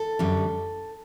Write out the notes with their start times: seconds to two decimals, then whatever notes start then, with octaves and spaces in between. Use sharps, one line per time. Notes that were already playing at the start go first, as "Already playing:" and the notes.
Already playing: A4
0.19 F#2 D3 G3